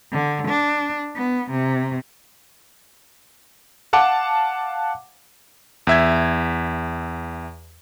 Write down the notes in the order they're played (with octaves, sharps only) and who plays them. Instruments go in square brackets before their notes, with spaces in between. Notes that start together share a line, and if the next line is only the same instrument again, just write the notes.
[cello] D3
D4
B3
C3
[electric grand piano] F5 F#5 A5 D6
E2 E5 G#6